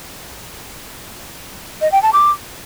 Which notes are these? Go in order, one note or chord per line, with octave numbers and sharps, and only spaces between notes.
D#5
G5
A5
D6